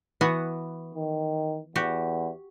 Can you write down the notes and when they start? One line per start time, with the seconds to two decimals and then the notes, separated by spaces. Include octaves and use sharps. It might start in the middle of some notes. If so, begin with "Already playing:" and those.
0.21 E3 B3 F#4
0.95 D#3
1.76 E2 F#4 G4